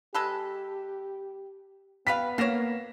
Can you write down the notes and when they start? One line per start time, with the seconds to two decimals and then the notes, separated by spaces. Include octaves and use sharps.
0.14 G#3 G4 A4 B4
2.07 G3 B3 B4 F5 B6
2.38 A#3 C#5 F5 A#6 E7